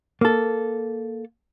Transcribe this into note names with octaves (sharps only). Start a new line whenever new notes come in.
A#3 A4